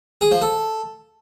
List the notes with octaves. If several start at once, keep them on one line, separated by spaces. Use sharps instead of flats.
G#4
F3
A4